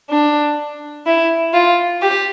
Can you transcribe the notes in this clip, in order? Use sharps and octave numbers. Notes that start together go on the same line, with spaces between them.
D4
E4
F4
G4